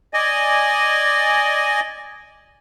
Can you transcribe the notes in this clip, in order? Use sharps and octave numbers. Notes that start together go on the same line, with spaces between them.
D5 D#5 G#5